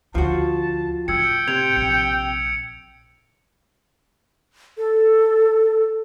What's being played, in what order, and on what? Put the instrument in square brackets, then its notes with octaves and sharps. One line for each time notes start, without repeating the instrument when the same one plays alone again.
[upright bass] D2 [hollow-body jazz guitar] F3 F#4 [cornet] A5
[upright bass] A2 [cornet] G5 [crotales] E6 G#6 C#7
[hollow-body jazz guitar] C3 [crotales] G#6 D7 F7
[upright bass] A#1 [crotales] C#7
[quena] A4